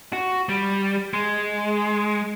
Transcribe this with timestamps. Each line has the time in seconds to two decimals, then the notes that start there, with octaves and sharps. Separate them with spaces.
0.13 F#4
0.49 G3
1.14 G#3